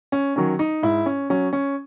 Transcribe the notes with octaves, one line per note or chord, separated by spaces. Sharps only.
C#4
D#3 F#3 C#4
D#4
G#2 E4
C#4
F#3 C#4
C#4